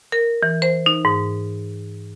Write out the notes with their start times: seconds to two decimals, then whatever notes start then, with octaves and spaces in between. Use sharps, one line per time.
0.12 A#4
0.43 E3
0.62 C5
0.86 D#4
1.05 G#2